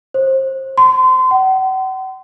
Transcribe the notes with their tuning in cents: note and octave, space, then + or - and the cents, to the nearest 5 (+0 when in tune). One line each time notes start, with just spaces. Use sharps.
C5 +30
C6 -30
F#5 +40